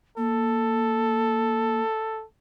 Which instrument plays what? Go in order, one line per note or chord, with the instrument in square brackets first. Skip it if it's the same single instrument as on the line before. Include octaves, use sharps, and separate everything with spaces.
[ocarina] A#3 [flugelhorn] A4